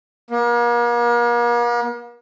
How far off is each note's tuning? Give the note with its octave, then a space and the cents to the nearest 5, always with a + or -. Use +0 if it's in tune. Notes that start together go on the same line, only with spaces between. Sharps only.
A#3 +40